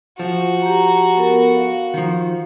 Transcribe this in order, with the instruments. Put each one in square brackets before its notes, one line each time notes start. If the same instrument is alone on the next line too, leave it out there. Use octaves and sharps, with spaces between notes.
[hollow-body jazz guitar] F3 [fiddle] F#4
[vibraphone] G4 A#5
B3 A4 A#4
F5
[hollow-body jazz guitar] D#3 F3